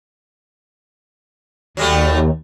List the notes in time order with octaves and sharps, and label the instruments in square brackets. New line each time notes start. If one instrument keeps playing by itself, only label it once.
[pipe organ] D#2 [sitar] F#3 G3 A3